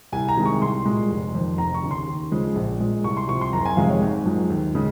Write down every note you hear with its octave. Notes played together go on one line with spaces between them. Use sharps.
C2 G#5
A#5
C3 D#3 G#3
C#6
C2 C6
A#2 G#3
F1
F2 D#3
F1 A#5
C#6
D#2 C#3
C6
D#2
C#3 F3 G#3
A#1
A#2 G#3
C2 C#6
C6
C3 F3 C#6
C6
F#1 A#5
G#5
F2 C3 D#3 G#3 F5
C#5
G#1
F#2 F3 G#3
D#2
C#3 G#3